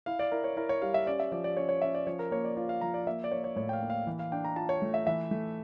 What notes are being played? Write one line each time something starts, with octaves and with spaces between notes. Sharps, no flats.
E4 F5
D5
E4 A#4
C#5
E4 A#4
C#5
G3 F5
E5
C#4 D5
E5
F3 D5
D5
C#4 C#5
C#5
C#4 E5
D5
F3 C#5
A#4
A#3 C#5
D5
F4 D5
F5
F3 A#5
D5
A#3 E5
D5
A#3 C#5
C#5
A2 C#5
G5
F5
A#3
F5
E3
F5
D4 G5
A#5
F4 A5
C#5
A3
E5
E3 E5
A3